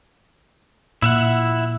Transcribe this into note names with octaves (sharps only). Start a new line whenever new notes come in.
A#2 E4 E5 F#5